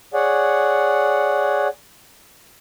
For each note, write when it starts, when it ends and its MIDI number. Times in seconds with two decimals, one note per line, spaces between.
0.14 1.68 68
0.14 1.68 73
0.14 1.68 74
0.14 1.68 78